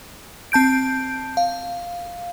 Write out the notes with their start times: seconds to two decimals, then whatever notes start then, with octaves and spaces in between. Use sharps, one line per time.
0.52 C4 A5 G6 D7
1.37 F5